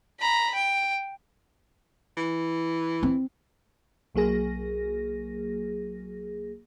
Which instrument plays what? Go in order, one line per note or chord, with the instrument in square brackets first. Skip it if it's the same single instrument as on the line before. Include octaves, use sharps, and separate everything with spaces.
[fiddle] A#5 B5
G5
[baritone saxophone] E3
[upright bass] C4
[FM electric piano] B1 F#3 A#3 G#4 A#6